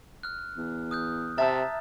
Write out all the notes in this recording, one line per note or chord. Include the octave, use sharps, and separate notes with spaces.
F6 F#6
E2
D#6 F#6 G6
C3 E5 A5 A#5 E6 A6